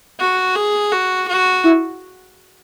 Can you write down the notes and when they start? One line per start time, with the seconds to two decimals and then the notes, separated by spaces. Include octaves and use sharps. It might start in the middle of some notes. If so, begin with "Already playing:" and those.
0.20 F#4
0.55 G#4
0.92 F#4
1.28 F#4
1.64 E4